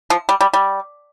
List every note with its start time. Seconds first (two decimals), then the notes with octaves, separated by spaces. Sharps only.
0.10 F3
0.29 G3
0.41 G3
0.53 G3